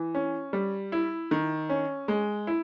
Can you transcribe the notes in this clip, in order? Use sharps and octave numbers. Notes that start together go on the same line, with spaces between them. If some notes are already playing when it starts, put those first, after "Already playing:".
Already playing: E3
C#4
G3
E4
D#3
C#4
G#3
E4